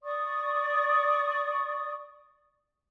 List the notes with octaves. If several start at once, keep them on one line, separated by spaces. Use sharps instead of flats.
D5 C#6 D#6